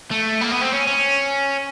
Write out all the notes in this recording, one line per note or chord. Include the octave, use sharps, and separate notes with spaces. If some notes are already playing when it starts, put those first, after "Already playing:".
A3
A#3
B3
C4
C#4
C#4